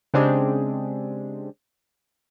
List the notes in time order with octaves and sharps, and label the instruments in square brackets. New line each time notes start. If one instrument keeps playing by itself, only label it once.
[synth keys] C#3 G#3 C4 D4 G4 G#4